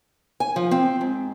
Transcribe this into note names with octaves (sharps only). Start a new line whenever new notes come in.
G#5
F3
C4
G#2